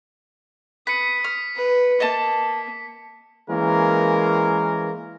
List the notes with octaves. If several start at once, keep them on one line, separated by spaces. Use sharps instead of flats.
B4 D#6 B6 C#7
F6
B4
A#3 D#5 A5
E3 G#3 A#3 C#4 A#4